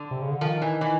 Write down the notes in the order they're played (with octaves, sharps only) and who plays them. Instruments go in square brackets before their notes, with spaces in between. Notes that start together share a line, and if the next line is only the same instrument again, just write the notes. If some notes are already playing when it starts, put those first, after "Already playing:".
Already playing: [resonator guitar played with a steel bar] D3
[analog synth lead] C3
C#3
D3
[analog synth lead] D#3 [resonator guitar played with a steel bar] F3
[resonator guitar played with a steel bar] E3
E3